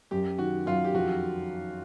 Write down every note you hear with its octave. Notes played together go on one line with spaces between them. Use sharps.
F#2 G4
D#3 F#4
F#2 F4
G4
F2 F#4